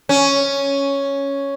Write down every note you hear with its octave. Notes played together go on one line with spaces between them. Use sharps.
C#4